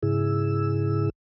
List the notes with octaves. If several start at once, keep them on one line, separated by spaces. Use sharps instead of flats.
G#2 C#3 E4 G#4 E6